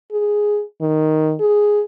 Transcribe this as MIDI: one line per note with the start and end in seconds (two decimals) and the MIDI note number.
0.12 0.63 68
0.81 1.35 51
1.40 1.82 68